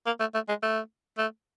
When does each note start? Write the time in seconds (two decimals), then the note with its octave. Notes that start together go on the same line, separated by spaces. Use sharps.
0.06 A#3
0.20 A3
0.34 A3
0.48 G#3
0.62 A3
1.18 A3